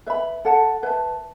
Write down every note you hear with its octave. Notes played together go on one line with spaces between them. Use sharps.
B4 E5 B5
A4 F#5 A5
B4 E5 A5